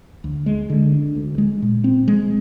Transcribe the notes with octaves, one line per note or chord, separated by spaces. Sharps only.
D2
G#3
D3
D4
D2
G#3
A#2
C4
G#3